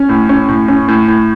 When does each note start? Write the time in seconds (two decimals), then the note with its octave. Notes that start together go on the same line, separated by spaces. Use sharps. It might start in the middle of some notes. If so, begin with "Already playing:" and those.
Already playing: C#4
0.09 A2
0.29 C#4
0.48 A2
0.68 C#4
0.88 A2
1.08 A2